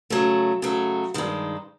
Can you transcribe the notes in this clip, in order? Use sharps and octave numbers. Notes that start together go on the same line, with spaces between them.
C#3 F#3 A3
C#3 F#3 A3
G2 D#3 G#3